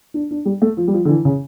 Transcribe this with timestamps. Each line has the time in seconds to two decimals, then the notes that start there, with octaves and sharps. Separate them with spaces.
0.14 D4
0.31 D4
0.45 G3
0.62 A3
0.77 F3
0.88 G3
0.93 F3
1.05 D3
1.09 E3
1.25 C#3